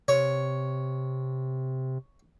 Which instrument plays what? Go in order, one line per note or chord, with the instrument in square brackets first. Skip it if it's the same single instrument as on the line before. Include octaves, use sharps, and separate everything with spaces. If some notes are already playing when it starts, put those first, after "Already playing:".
[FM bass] C3 [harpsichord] C#5